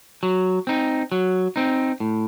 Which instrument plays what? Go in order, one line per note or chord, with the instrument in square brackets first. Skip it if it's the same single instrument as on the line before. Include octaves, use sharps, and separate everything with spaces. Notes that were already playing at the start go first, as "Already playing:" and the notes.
[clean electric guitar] F#3
C4 D#4
F#3
C4 D#4
A2